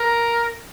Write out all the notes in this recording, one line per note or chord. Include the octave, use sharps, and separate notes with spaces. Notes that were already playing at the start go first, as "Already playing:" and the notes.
Already playing: A#4